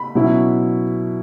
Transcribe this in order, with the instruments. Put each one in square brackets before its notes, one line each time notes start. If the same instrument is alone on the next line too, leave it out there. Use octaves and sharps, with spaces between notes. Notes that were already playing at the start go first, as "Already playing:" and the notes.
Already playing: [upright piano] B5
B2 F#3 C#4 E4